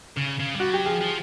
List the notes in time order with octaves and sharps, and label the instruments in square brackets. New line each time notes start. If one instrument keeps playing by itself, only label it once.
[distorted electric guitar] C#3
C#3
G3
[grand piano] F#4
[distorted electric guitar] F#3 [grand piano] G4
[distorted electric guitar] F3 [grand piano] G#4
[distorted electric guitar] F3